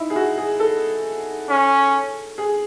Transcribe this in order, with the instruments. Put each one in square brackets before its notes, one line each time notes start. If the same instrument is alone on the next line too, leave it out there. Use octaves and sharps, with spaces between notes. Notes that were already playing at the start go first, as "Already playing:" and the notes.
Already playing: [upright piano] D#4 E4
G#4
F#4
G#4
A4
[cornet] C#4
[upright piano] G#4